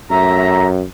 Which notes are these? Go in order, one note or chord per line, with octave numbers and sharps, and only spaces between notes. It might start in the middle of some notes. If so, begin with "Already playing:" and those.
F#2 A3 E5 A#5